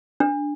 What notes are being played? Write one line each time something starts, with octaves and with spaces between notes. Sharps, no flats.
D4